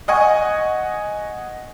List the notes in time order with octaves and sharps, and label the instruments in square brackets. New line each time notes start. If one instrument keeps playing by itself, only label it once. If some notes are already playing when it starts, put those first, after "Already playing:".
[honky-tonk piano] D#5 F#5 G#5 C#6